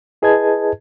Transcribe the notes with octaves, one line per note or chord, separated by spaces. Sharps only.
E4 G#4 B4 D#5 A5 G#6